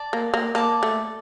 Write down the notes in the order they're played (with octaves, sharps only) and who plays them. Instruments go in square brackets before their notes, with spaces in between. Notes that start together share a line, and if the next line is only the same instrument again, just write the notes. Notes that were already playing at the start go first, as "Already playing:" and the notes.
Already playing: [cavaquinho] D5 A5
[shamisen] A#3
A#3
[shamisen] A#3 [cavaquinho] D5 A5 D6
[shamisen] A3